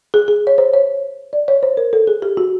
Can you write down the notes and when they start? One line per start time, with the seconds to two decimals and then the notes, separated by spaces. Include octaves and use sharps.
0.14 G#4
0.28 G#4
0.47 C#5
0.58 C5
0.73 C#5
1.33 D5
1.48 C#5
1.63 C5
1.77 A#4
1.93 A4
2.07 G#4
2.22 G4
2.37 F#4